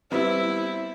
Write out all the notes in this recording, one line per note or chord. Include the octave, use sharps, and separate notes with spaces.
G3 B3 C4 E4